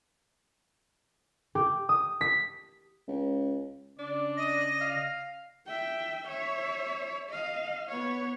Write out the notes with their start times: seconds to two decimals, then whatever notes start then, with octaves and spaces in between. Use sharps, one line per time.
1.55 G4
1.89 D#6
2.21 B6
3.08 C#2
3.99 C#3 D4 D5
4.37 D#5 A#6
4.81 F5
5.66 E5 G5
6.27 C#5 E5
7.29 D#5 F5
7.88 B3 C#5